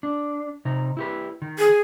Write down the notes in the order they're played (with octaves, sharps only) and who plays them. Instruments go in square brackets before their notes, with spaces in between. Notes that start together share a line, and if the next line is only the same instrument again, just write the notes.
[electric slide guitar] D4
C3 D#4
E4 G4 B4
D#3
[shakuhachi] G#4